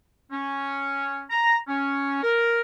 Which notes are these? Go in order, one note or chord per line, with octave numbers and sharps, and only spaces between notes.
C#4
A#5
C#4
A#4